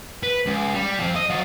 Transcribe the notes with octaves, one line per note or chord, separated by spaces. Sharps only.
B4
C#2
G3
F3 C4
D#5
F#3 F4